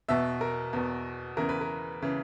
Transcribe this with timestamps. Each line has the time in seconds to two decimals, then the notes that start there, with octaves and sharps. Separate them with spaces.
0.08 E2 B2 E5
0.41 A#4
0.73 E2 B2
1.37 E2 C#3 E3 A#4
1.49 B4
1.61 A#4
2.02 C#3 E3